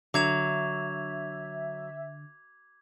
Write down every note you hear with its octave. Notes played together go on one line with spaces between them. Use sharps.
D3 F#3 E5 D6 G#6 F7